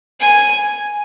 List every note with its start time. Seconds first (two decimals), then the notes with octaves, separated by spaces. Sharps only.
0.20 G#5